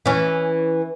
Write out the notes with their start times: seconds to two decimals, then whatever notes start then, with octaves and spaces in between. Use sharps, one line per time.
0.06 E3 C#4